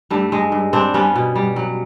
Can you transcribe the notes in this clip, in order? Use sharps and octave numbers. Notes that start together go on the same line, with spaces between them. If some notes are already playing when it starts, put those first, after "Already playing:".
G2 G3 A3
G2 G#3
G2
G3 C4 D4
G3 B3 C#4
B2
G3
F#3